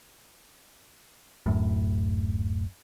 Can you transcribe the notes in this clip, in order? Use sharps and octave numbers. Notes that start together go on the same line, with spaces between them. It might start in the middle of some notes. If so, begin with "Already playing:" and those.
D1 F#2 A2